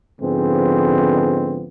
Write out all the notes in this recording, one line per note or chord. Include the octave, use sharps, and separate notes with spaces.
G#2 D3 F3 G#3 B3 C4